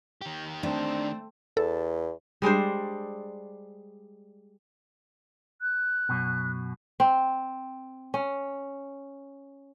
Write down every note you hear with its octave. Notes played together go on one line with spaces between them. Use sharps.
D#3 G4
A3 C4 D4
E2 A4
G3 G#3 D4 C5
F#6
F#2 B2
C4
C#4